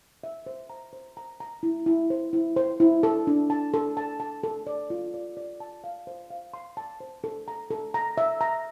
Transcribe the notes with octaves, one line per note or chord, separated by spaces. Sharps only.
E5
C5
A#5
C5
A#5
A#5
E4
E4
C5
E4
C5
E4
A4
D4
A5
A4
A5
A5
A4
D5
F4
D5
D5
A5
F5
C5
F5
C6
A5
C5
A4
A#5
A4
A#5
E5
A#5